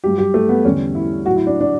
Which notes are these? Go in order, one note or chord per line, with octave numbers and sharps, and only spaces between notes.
G2 F#3 G4
G4
A3
B3
E2 D3 G3 C#4
E4
A2 F#3 F#4
E4
D4
D4